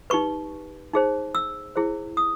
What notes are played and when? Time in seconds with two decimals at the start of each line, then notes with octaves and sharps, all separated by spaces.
0.10 D#4 G4 B4 C#6
0.94 D#4 G#4 C5
1.35 E6
1.76 E4 G#4 C5
2.17 D#6